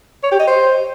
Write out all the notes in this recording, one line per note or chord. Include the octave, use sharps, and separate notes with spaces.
C#5
G4
D#5
C5